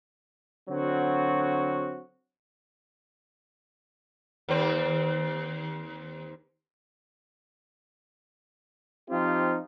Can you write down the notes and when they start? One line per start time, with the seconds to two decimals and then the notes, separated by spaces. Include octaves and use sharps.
0.69 D3 F#3 C4 F#4
4.49 D#2 C4
9.10 F3 C4 D#4 F4 G4